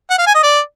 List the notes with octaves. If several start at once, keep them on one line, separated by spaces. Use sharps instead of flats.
F#5
F5
G#5
D#5
D5